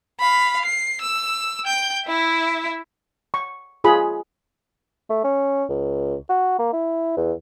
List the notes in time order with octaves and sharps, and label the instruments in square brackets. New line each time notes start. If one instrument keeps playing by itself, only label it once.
[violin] F5 B5
C7
E6
G5 G6
E4 E5
[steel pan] C#6
F4 G#4 B5
[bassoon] A3
C#4
C#2
F#4
A#3
E4
E2